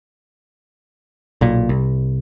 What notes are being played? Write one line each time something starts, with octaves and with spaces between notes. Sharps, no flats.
B1 A#2
C2